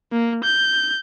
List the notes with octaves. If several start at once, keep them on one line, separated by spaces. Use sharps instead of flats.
A#3
G6